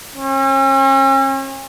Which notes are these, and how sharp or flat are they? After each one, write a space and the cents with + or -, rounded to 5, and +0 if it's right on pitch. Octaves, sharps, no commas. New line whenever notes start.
C#4 -40